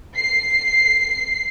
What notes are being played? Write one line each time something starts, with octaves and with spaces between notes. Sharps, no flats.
C7